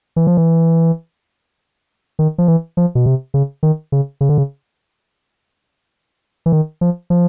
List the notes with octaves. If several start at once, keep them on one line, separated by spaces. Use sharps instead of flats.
E3
F3
E3
D#3
F3
E3
F3
B2
C3
C#3
D#3
C#3
C#3
D3
C#3
E3
D#3
F3
F3